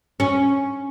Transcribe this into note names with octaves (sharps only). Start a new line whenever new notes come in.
C#4